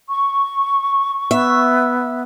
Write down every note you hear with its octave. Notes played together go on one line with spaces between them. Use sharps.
C#6
B3 E5